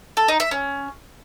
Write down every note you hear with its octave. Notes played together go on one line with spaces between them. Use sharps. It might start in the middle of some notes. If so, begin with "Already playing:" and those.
A4
D#4
E5
C#4